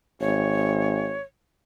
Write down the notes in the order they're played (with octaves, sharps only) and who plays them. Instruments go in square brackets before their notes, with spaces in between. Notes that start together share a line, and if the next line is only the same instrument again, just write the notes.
[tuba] G#1 [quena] C#5